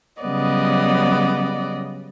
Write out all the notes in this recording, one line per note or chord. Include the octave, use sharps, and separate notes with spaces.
C#3 F#3 G3 B3 D5 D#5